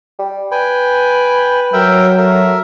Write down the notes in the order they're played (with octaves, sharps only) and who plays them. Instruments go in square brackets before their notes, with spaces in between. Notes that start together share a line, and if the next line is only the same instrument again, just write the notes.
[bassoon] G3
[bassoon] B4 [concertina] G5 G#5
[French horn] F#3 [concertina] A#4 E5 G5
[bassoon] A3 [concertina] A#4 E5